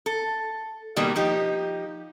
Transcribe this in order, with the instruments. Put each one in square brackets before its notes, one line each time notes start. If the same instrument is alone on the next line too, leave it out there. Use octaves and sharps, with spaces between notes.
[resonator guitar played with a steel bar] A4
B2 D#3 G3 A#3
F3 D#4 G4